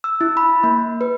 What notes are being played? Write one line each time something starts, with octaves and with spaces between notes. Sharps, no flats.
E6
E4
B5
A#3
B4